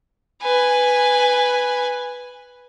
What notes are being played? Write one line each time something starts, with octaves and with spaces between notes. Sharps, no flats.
B4 G#5